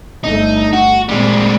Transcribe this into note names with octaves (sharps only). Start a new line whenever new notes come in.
G1 A3 D#4
F#4
A#2 G3 G#3 C4